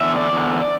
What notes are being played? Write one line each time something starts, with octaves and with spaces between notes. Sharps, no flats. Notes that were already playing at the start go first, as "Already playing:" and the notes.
E2 D3 E5
D5
E2 D3